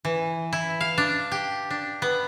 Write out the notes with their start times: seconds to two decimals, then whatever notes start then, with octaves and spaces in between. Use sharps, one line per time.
0.05 E3
0.53 E4
0.81 F5
0.98 D4
1.32 G4
1.70 D4
2.02 B3